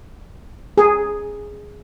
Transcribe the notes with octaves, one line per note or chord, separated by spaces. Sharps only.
G#4